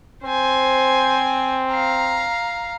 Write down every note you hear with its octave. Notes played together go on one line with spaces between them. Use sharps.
C4 C5 G#5
F5 A#5